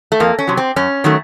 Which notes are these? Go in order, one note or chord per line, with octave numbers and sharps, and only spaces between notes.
A3
F2 A#3
C#4
C3 F#3
C4
F#2 C#4
D#3 F#3 A3